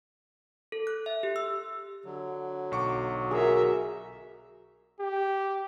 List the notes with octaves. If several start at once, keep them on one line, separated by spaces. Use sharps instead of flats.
A4
F#6
E5
G4
E6
D3 F#3
B1 C#6 D6
F#4 G#4 A#4 E5
G4